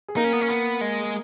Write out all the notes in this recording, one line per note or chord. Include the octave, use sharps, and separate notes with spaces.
G#4
A#3 D#4 A#4
C#4
B3
C#4
B3
G#3